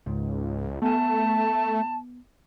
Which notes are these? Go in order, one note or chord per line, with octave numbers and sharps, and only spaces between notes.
C#2 G#2
A3 B3 G#5 A5